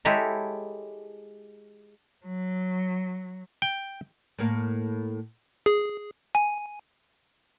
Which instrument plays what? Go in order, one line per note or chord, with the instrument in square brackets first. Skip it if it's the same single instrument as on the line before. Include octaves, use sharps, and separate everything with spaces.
[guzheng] G#3 E4 G4 A4 C#5 A#5
[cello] F#3
[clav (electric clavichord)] G5
[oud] A2 A#3
[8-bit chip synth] G#4
G#5